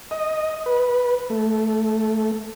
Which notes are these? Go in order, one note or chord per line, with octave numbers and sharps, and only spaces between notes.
D#5
B4
A3